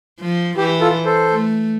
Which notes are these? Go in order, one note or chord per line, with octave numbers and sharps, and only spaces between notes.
F3
E3 G4
F4 A4
A4 C5
A3